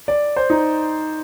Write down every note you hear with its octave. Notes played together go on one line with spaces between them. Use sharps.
D5
C5
D#4